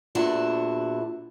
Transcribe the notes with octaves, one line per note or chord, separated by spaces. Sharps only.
E2 A#2 D4 E4 F#4 A5